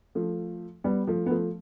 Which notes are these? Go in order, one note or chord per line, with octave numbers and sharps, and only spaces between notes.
F3 A3
G3 B3
F3 A3
B3
F3 A3